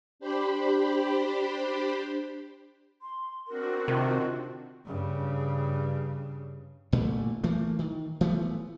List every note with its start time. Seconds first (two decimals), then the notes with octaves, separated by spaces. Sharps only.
0.19 D4 G4 C5 B5
3.02 C6
3.48 C4 D4 F#4 A#4
3.88 C3 D#3 F4
4.86 G2 C#3
6.92 A1 A#2 D3 A3
7.43 E3 A3 A#3
7.79 D#3
8.21 E3 F3 A3 B3